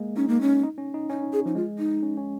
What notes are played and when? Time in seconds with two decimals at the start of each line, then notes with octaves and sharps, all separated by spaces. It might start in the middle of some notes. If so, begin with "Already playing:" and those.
Already playing: G#3 A#3
0.16 C#4 D#4
0.28 A#3
0.41 C#4
0.63 D#4
0.78 C#4
0.94 D#4
1.09 C#4 D#4
1.33 G#4
1.46 F3 D#4
1.55 G#3 F4
1.79 D#4
2.03 C#4
2.17 C#4